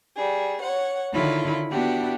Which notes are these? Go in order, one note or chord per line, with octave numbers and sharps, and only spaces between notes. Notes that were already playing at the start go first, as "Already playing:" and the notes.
G3 G#4
C#5 F#5
D3 D#3 E4 F4 C#5 B5
B3 D4 E4 F#4 G4 F#5